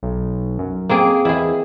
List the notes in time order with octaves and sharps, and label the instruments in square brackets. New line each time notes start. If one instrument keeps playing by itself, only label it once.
[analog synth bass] B1
F#2
[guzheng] A#3 C4 G#4
[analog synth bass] E2 [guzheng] E4 G#4